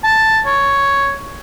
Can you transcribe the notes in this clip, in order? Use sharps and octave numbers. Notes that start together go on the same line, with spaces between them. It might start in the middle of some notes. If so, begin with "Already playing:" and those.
A5
C#5